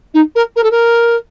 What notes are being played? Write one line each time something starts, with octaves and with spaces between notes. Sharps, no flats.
D#4
A#4
A#4
A4
A#4